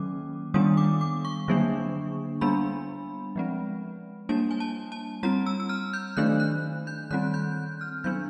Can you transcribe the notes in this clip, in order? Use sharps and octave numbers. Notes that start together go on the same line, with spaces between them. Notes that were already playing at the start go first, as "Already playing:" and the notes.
Already playing: D#3 F#3 A#3 C#4 D6
D#3 G3 B3 D4 D#6
D6
D6
C#6
D3 F#3 A#3 D4
G3 B3 D4 B5
F3 G#3 C4
G3 A#3 D4 A5
G#5
A5
A5
G3 C4 A#5
E6
E6
F6
G6
D#3 F#3 A3 D4 F#6
F#6
G6
D#3 G3 C4 F#6
G6
F6
F#3 B3 D4 G6